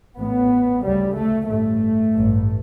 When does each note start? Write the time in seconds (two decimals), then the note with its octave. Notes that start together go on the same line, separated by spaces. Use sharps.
0.18 A1 A2 B3
0.83 D2 C#3 G3
1.16 A3
1.48 A1 G2 A3
2.13 A1 G2